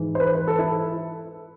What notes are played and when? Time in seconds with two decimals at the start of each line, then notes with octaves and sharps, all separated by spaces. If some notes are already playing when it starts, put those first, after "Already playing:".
Already playing: G#2 E3
0.15 C5
0.20 B4
0.35 B4
0.48 A4
0.59 E4